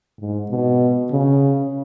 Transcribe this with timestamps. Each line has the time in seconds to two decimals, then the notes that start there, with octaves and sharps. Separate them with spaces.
0.20 G#2
0.50 B2
1.11 C#3